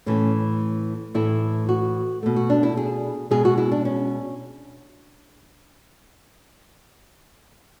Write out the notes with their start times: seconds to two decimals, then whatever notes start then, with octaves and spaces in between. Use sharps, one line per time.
0.06 A2 E3 A3 C#4
1.14 A2 E3 A3 E4
1.69 F#4
2.23 B2 A3
2.36 F#4
2.50 D4
2.63 E4
2.77 G#4
3.31 B2 G#3 G#4
3.45 F#4
3.58 E4
3.71 D4
3.85 C#4